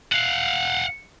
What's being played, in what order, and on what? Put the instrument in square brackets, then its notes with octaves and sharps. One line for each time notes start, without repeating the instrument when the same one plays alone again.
[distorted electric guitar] F5 F#5